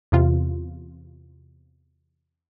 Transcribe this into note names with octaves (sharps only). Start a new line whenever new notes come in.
E2 C3 F4